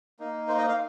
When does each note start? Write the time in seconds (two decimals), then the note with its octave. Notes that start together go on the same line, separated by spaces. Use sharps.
0.19 A#3 D#4
0.48 C5
0.58 D#5
0.68 F5